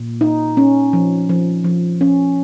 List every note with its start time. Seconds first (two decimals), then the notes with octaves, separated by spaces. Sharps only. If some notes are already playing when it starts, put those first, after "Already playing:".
Already playing: A#2
0.21 D#4
0.57 C#4
0.93 F3
1.29 F3
1.64 F3
2.01 C#4